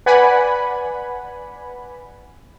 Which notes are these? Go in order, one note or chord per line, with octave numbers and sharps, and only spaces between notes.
B4 D5 F#5 G#5 B5